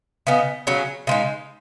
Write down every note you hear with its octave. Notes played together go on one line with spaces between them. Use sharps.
C#3 B3 D#4
C#3 F#3 C#4
C#3 G#3 D#4